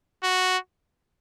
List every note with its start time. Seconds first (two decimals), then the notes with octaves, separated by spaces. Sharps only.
0.24 F#4